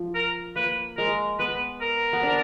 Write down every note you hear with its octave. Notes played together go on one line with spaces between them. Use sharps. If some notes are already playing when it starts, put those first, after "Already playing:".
Already playing: F3
A#4
A#3 B4
G#3 A#4
B3 B4
A#4
B3
D4